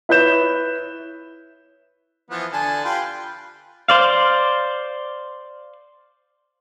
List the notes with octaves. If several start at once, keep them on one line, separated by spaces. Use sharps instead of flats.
E4 B4 C#5 G6 E7
E3 F3 B3
D3 G#5 A5
F4 G4 B4
C5 D5 F5